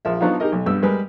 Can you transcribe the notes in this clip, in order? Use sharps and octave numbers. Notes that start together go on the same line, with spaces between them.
A#1 F3 A#4 E5
F3 F#3 B3 D4 D#4 F4
D#4 G4 G#4 A#4 D#5
B1
G2 G3 B3 E6
G3 G#3 A#4 B4